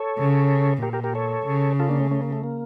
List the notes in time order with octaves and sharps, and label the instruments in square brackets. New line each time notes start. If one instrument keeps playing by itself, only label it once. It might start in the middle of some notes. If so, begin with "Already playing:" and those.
Already playing: [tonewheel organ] A4 C#5
[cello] C#3
[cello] A#2 [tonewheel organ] G4 A#4
[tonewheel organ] G4 A#4
G4 A#4
A4 C#5
[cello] C#3
[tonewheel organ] F4 A4
A#3 D4
A3 C#4
A3 C#4
A#3
A3
A#3